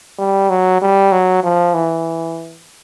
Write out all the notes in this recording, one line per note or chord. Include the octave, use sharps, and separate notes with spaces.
G3
F#3
G3
F#3
F3
E3